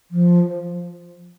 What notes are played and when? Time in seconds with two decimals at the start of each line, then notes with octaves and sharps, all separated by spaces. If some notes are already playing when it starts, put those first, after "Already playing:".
0.11 F3